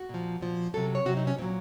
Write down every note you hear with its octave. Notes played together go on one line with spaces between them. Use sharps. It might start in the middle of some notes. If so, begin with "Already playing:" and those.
Already playing: F#4
A#2 F3
A#2 F3
C3 F#3 A4
C#5
C3 F#3 F#4
D#4
C#4
A#2 F#3 C4